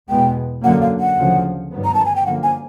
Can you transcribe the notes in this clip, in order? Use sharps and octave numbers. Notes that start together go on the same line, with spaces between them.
E2 B2 G#3 B3 G5
F#2 D3 F#3 A#3 F#5
F5
F#5
D2 C#3 F3
G2 D#3 F#3 B3
A#5
A5
G#5
G5
F#2 D3 F3 A#3 F#5
G#5